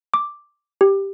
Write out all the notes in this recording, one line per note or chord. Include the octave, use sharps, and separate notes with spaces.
D6
G4